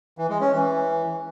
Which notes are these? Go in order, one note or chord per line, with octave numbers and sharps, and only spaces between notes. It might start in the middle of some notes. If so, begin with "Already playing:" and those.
E3
G#3
C#4
E3